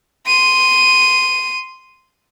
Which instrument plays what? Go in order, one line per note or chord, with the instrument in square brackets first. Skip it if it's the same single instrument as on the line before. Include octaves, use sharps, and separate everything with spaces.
[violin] C6 D#7